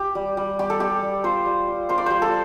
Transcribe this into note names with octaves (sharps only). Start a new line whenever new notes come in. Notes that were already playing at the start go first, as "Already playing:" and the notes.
Already playing: G4
G3
G3
G3 G4
A4
G3 G4
G3
F4 C5
G3
F4
F4 C5
D5
G3 C5
A4